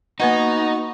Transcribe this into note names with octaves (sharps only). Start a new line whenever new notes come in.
A#3 B3 D#4 F#4 B4 F#5